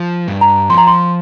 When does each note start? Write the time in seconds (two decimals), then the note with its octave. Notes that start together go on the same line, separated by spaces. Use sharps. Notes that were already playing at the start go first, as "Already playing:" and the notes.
Already playing: F3
0.28 G2
0.41 A#5
0.70 F3 C6
0.78 A#5
0.87 C6